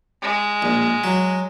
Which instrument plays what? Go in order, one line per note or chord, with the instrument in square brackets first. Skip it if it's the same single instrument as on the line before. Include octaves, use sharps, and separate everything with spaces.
[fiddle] G#3
[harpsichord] A#1
F#3